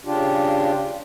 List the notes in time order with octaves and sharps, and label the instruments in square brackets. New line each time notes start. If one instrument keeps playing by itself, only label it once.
[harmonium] C#3 D4 F4 G4